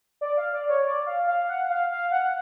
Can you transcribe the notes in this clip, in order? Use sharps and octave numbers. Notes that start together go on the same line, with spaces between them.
D5
F5
D5
C#5
D5
F5
F5
F#5
F5
F5
F#5